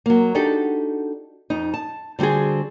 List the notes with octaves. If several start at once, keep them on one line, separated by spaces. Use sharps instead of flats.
F#3 A#3
D4 D#4 F#4 G4 A4
F2 D#4
A5
D3 G3 C4 F#4 G#4